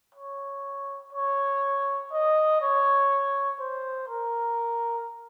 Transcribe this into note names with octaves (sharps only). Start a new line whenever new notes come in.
C#5
C#5
D#5
C#5
C5
A#4